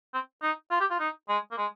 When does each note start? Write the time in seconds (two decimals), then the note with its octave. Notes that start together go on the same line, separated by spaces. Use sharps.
0.14 C4
0.42 D#4
0.71 F4
0.80 G4
0.90 F4
1.00 D#4
1.29 G#3
1.51 A#3
1.58 G#3